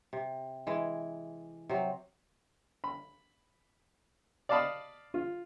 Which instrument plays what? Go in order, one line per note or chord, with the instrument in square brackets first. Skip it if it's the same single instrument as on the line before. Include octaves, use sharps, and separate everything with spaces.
[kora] C3
E3 G#3
C3 F#3
[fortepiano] B5
D5 D#5 F5 A5 B5 D#6
F4